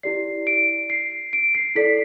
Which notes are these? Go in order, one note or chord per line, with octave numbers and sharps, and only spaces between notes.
E4 G4 D5 C7
D7
C7
D7
C7
E4 A4 D5 B6